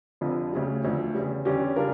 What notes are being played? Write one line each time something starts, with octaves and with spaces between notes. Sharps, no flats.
F1 F2 D3 F3
D2 C#3 G3
E1 D2 D3 F3
E2 C#3 G3
E2 D3 G3 C#4 G4
C#3 G3 D4 F4 A#4